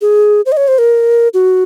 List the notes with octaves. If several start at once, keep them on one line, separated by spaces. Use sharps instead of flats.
G#4
C5
D#5
C#5
C5
A#4
F#4